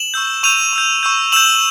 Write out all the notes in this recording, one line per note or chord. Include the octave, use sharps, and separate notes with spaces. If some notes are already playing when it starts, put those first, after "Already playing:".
Already playing: E7 F#7
C#6 E6 G6
C#6 E6 G6 D#7 F7
C#6 E6 G6
C#6 E6 G6
C#6 E6 G6 E7 F#7